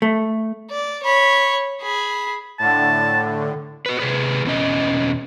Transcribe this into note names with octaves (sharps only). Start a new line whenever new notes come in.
A3
D5
C#5 B5
G#4 B5
A2 D3 A5
F#4 B4
C3 G#4 B4
E2 B2 E3 C#4 D#5